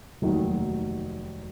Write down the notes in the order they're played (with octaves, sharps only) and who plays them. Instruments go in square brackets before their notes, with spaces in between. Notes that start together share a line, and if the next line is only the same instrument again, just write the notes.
[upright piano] F1 D#2 D#3 F#3